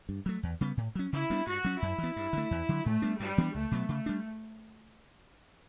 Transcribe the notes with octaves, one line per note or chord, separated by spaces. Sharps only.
G2
F#3 A3
E2
C#3 G3 B3
A2
F#3 C#4
C#3 E4
G3 B3 D4
G2 F#4
F#3 C#4
F#2 E4
E3
B3
G2
D3 A3
E2
D3 F#3
A2 A3
G3 B3 D4
G2 G3
E3 B3 D4
C#2 A3
B2 F#3 B3
C#3
G3 D4